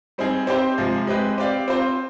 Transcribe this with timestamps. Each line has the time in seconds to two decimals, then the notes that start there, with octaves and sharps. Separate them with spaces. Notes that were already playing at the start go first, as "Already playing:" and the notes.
0.18 G3 C4 D#4 G#4
0.47 C4 G4 C5 D#5
0.78 C3 F3 G#3
1.07 G#3 C4 G4 B4 D#5
1.38 C4 G4 D5 F5
1.68 C4 F4 C5